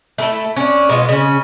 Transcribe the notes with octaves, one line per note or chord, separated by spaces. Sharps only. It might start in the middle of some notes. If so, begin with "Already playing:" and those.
A3 E4 A4
C#4 D4
B2 G#3 F4
C#3 C#4